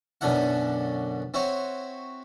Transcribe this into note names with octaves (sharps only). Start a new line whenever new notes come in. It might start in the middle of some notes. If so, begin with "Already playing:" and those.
B1 F#2 B2 D3 E4 F#5
C4 E4 F#4 C#5